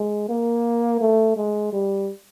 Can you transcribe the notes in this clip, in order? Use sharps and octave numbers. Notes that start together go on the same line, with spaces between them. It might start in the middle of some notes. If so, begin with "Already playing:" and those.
Already playing: G#3
A#3
A3
G#3
G3